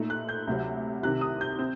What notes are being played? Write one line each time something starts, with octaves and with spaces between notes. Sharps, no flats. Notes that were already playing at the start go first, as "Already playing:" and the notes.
Already playing: A#2 A3 D#4
F#6
G6
D2 C3 F#3 C4
C2 C3 D#3 F#6
D#6
G6
C4